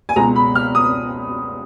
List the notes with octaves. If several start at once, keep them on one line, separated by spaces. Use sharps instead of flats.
G#5
C#2 B2 G#3 A#5
B5
F6
D#6